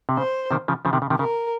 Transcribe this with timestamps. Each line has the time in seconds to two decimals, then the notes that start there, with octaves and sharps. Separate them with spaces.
0.09 C3
0.17 C#3 C5
0.51 C3 D#3
0.68 C#3 F3
0.85 C#3 F3
0.93 C3 D#3
1.02 C#3
1.10 C3 D#3
1.19 C#3 A#4